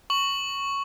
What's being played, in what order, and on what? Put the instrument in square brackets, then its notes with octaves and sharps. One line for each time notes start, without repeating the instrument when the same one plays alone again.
[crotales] C#6 F#7